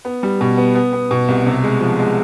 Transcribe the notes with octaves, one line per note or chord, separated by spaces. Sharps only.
B3
G3
B2
B3
B3
B3
B2
C2
C3
G#3
F3
G#3